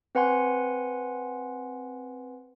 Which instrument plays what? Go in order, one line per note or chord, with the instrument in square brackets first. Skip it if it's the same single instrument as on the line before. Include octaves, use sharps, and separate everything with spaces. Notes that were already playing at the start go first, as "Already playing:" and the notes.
[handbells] C4 B4 F#5 G#5 C6